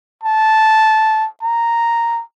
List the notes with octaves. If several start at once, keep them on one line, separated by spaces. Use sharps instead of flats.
A5
A#5